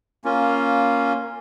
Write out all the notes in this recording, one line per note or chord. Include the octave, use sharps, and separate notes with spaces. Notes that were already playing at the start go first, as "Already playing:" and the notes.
A#3 C#4 F4